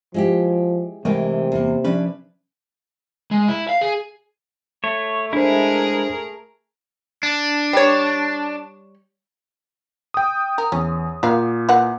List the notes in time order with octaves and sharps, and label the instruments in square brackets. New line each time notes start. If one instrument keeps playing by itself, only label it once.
[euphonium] F3 [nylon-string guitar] G#3 E4 G4
[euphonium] C3 [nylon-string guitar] E3 G#3 [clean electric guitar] A3 A#4 G5
[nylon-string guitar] E2 A#3
[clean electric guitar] F3 C#4 [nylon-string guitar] D4 E4 B4
[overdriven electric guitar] G#3
E4
F5
G#4
[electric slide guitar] A3 [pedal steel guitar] C#5
[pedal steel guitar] G#3 E4 [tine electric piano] D4 C5 [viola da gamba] G#4 A#4
[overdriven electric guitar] D4
[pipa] G3 C#5
[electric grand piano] G5 D#6
[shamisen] A#4
[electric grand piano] E2 [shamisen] C#4
[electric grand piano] A#2 [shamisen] A#3 F#4 F5
[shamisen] E3 A#3 F#5